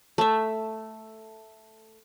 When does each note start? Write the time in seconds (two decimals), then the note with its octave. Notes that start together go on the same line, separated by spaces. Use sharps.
0.18 A3 E5